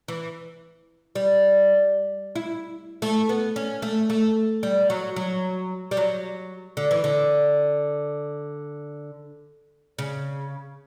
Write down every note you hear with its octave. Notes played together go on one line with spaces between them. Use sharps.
E3
G3
E4
A3
B3
C#4
A3
A3
G3
F#3
F#3
G3
F#3
D3
E3
D3
C#3